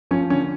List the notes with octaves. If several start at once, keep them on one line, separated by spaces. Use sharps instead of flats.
F3 C#4
D3 C#4